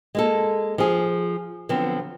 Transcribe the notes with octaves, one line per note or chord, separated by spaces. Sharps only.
G#3 A#3 A4
F3 G#4
D3 F3 F#3 B3 C4